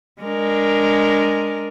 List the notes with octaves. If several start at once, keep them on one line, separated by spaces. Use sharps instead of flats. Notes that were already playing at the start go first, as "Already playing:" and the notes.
G#3 D4 A#4